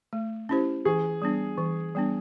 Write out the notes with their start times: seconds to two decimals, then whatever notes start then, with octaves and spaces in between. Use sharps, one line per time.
0.13 A3
0.49 C#4 E4 G4 C5
0.85 E3 G#4
1.22 G3 B3 D4
1.58 E3
1.95 G3 B3 D4